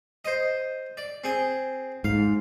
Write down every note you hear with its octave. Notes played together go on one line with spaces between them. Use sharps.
C5 D#5
D5
C4 G#4
G#2 F5